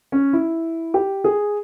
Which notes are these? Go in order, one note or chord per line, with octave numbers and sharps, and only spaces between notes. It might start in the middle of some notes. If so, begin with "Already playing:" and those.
C#4
E4
G4
G#4